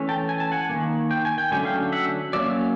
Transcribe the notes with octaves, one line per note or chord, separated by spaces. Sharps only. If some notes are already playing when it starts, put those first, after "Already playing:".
Already playing: E3 A3 C#4
G5 A5
G#5
A5
F#5 G#5
D#3 G3 A#3
G5
G#5
G5
D3 F#3 A3 C#4 G#5
F5 G5
E5 F#5
F#3 A#3 C#4 D5 E5